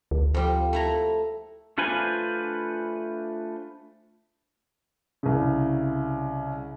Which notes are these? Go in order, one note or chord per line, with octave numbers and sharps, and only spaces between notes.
D2
F2 G3 G5
A3 E4 A#5
A3 D4 F4 B4 C5 G#5
C2 C#3